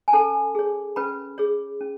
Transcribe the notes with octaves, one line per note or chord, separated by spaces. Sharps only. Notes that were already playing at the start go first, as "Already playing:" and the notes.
G#5
C#4 A4 A5
G#4 C#5
C#4 B4 B5
G#4 C#5
C#4